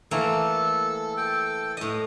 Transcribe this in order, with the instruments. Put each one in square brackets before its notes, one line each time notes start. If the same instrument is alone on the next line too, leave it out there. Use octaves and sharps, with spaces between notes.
[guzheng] E3 A3 A#3 [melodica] A4
[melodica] A4 G5
[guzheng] A2 D#5